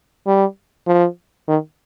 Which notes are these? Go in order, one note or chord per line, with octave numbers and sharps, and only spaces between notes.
G3
F3
D#3